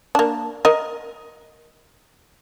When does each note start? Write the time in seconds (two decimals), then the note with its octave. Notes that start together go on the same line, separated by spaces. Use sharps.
0.15 A#3 D4
0.65 A#4 D#5